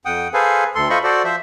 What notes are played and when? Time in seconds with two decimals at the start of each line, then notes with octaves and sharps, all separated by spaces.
0.05 F2 F#5 G5 D#6
0.34 G#4 A4 B4 C5 F5 G#5
0.75 D2 A4 C6
0.90 F4 A4 C5 D#5 B5 C#6
1.04 F#4 A4 C5 D5
1.24 F3 C5 E5